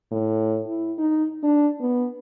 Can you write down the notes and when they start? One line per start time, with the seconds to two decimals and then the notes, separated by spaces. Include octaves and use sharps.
0.12 A2
0.66 E4
0.98 D#4
1.43 D4
1.81 B3